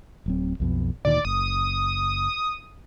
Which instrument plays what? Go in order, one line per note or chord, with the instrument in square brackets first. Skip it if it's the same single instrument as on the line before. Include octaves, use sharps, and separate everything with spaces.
[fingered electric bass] D1 F#3 C4
B1 F2 B2
[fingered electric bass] D2 A#2 D#3 [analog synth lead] D5
[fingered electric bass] F#1 [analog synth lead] D#6